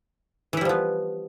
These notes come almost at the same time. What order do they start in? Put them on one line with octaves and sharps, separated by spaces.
E3 E4 G3 F3 B3